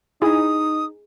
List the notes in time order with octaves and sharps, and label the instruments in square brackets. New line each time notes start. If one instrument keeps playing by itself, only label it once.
[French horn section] D#4 [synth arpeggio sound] E4 [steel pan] G#4 [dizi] D#6